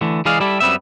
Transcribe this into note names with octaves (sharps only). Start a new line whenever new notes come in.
D3 E3 A3
E3 G#3 G#4 D5 F5
G3 E4 G4 A4
F#2 G3 B3 C4 G4 E5